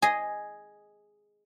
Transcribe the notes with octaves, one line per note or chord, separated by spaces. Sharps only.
G#4 D#5